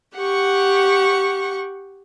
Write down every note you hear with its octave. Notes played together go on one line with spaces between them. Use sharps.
G4 F#5 C#6